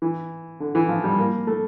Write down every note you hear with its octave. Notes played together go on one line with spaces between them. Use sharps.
E3
D3
E3
F3
G3
A#3
A3